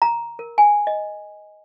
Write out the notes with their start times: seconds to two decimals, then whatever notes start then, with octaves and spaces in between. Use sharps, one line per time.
0.02 A#5
0.39 A#4
0.58 G#5
0.87 D#5